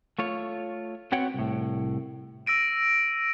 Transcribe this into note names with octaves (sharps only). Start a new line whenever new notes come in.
A3 F4 C#5
B3 C4 F#4 C#5 F#5 G5
C2 A2
E6 A#6 D7 D#7